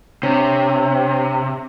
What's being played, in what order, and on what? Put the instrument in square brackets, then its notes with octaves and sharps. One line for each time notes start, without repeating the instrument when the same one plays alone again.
[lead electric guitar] C3 [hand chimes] D4 C#5